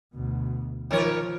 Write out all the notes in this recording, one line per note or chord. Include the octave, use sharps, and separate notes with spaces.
D2 B2
D#3 F3 A#4 C#5